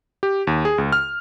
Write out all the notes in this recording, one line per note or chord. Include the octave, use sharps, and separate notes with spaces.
G4
D#2
G#4
C#2
F6